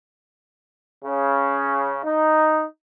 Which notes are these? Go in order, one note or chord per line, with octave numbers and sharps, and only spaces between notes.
C#3
D#4